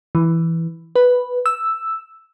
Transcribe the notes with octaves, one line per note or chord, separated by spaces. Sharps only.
E3
B4
E6